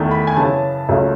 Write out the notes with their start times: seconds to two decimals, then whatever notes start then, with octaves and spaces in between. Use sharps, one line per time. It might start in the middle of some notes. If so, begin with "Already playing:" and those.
Already playing: E2 D#3 A3
0.11 B5
0.27 G#5
0.37 F#2 C#3 E3 A5
0.89 C#2 C#3 F#3 A3